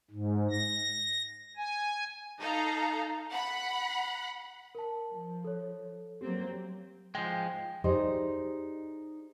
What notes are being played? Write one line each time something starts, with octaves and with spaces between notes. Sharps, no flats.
G#2
A#6
G#5
D#4 A4 F5 A#5
F#5 B5
A#4 A5
F3
A4 C#5
F#3 A#3 C4 G4
F3 G#3 G5
D#4 G4 G#4 C5 D5 D#5